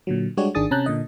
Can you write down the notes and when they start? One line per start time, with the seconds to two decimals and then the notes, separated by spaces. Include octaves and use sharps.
0.07 A#2 D3 F#3
0.37 G3 G#3 D4 F#4 G4 C#5
0.55 G#1 D#3 D4 G#4 D#6 A6
0.71 C3 C#4 A5 A#5 F#6 G6
0.86 A#2 D3 D#5